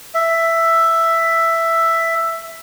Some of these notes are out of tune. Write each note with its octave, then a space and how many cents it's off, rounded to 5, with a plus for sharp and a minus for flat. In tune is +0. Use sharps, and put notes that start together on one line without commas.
E5 +5